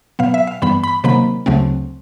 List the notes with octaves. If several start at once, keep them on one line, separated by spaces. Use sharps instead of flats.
B2 F#3 B3 F5
E5
F5
G2 E3 G3 B3 B5
B5
C3 D#3 F#3 A#3 B5
D2 C#3 F#3 A3 C4